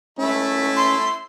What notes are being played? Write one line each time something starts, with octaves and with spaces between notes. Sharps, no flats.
A3 C#4 E4
C6